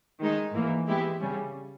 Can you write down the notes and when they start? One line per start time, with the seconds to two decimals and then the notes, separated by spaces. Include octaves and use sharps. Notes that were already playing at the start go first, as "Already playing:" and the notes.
0.19 D#3 G#3 D#4
0.54 G#2 E3 A#3
0.87 E3 G#3 B3 E4 G4
1.21 C#3 G3 C#4